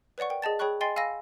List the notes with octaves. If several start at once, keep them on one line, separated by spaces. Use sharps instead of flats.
B4 C#5 D5 F#5 C#6
A#4 G5
G#4 D#5 A5 A6
G#4 C#5 G5 B5 C#6 F#6
D#5 G5 G#5 C6 A6 C7
F5 G#5 B5 E6 A#6